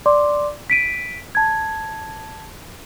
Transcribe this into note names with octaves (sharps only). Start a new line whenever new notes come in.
D5 C6 D6
B6 D7 D#7
A5 G#6